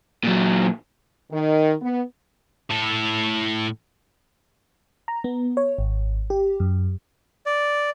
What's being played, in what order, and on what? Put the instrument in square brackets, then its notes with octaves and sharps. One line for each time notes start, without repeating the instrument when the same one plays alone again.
[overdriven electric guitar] A#2 F#3
[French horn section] D#3
B3
[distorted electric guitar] A2 A4
[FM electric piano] A#5
B3
C#5
G#1
G4
F#2
[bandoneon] D5